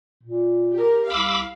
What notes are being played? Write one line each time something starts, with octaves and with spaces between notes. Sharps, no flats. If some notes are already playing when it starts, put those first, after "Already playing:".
A#2
G4 A#4
C2 F5 B5 D6 E6